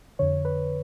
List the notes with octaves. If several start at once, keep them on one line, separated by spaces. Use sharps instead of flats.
F2 D3 C#5
B4